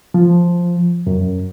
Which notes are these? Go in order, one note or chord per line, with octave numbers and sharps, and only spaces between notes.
F3
F#2